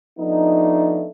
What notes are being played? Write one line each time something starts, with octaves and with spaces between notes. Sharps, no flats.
F3 A3 B3 D4 D#4